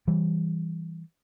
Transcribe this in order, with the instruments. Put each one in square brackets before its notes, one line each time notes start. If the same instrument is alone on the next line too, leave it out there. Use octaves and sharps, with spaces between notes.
[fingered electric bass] E3 G3